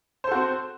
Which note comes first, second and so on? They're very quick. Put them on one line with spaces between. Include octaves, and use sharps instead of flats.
C5 A4 F#4 C4